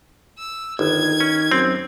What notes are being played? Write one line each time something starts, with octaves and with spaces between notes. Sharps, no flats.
E6
G1 D#3 G#6
C#4
F#2 C4